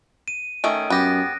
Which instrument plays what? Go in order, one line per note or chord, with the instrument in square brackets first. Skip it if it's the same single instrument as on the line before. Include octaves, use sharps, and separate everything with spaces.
[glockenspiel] D#7
[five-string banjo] D#3 A3 C#4 [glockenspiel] D#6 D7
[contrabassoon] F#2 [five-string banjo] B3 G4 [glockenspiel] F#6 A#6